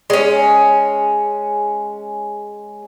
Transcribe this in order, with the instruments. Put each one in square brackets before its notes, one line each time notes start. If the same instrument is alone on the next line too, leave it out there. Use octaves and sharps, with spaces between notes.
[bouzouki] G#3 C#4